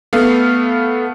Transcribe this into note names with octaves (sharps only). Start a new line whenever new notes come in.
A3 B3 F5